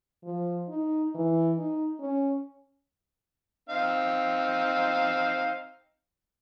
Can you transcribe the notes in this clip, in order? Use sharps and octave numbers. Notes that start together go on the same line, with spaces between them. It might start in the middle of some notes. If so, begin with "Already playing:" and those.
F3
D#4
E3
D#4
C#4
C4 D#4 F5